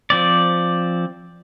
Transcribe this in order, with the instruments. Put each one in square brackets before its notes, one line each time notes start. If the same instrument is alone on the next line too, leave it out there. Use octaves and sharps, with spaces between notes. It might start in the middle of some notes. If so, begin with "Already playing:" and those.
[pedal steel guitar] F3 C4 D5